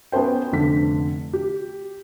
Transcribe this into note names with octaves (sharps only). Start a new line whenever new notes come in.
B3 C#4 B4 C5 G5
F1 D3 B6
G4